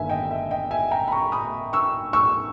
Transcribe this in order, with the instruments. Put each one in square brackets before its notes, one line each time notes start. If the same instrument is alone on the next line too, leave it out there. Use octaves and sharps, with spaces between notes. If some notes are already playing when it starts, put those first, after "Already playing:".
Already playing: [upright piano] G1 G2 D#3 A#3 E5 G#5
D#5 G5
E5
D#5 G5
E5 G#5
G5 A#5
B5
A#5 C#6
B5 D#6
C#6 E6
C#6 E6